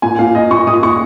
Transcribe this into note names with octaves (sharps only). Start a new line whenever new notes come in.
A#2 G#5
A#2 F5
A#2 D#5
A#2 C#6
A#2 D#6
A#2 C#6